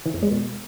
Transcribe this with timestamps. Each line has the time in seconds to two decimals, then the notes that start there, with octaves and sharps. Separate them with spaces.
0.06 E3
0.14 F2
0.22 G#3
0.31 B2